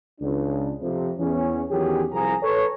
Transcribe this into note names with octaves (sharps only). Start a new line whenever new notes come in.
C#2 D4
F2 C3
E2 C#4
E2 D#3 F#3 C#4 G4 G#4
C2 F3 G#4 A#5
A4 B4 C#5